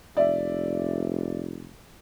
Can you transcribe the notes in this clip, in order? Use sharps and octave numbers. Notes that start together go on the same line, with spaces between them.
F1 D5 E5